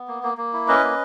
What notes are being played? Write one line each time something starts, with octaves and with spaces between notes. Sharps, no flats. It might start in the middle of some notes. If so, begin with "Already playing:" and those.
Already playing: B3
A#3
A#3
A#3
E4
C#4 B4 D#5
A#3